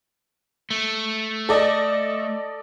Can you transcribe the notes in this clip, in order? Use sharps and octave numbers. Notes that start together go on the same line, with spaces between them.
A3
A4 D5 D#5